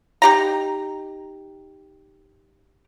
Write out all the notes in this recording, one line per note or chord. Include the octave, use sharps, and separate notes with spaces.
D#4 G4 A#5